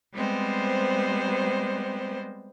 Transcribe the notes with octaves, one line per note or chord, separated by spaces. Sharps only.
G3 G#3 B3 C4 C5